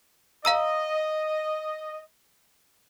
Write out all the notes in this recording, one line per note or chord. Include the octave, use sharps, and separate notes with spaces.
D#5 F5 A#5 E6